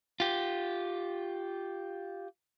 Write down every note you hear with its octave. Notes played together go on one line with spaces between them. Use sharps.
F4 G4